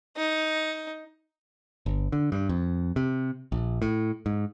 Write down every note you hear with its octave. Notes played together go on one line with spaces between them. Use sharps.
D#4
G1
D3
G2
F2
C3
A#1
A2
G#2